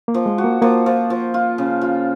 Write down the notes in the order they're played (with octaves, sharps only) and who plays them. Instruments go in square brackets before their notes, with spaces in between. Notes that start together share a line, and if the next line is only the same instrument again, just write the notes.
[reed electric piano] A#3
[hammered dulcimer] F3
[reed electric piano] G#3
[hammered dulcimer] F#4
[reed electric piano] A#3
[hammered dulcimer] F3 [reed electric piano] A#3
[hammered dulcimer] F3
F3
F4
C#3
F4